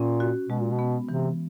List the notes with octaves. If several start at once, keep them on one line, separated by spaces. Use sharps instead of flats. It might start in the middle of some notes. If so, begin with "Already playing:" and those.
Already playing: A#2 C#4
F#4
B2 G#3
A#2
B2
B3
C3 E3